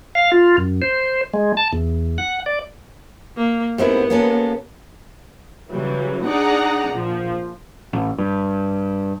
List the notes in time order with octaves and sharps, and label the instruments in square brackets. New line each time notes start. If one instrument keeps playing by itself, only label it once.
[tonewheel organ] F5
F4
F#2
C5
G#3
A5
E2
F#5
D5
[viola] A#3
[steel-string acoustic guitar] G#2 C4 E4 [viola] B3 [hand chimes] G4 A#4
[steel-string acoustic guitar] A#3 C#4 A4
[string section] C#3 E3 F#3 G3
D4 D#4 G#4 D5 F#5 A#5
A#1 F3
[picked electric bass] A1
G2